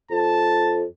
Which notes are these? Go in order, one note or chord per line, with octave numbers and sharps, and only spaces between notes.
F2 A5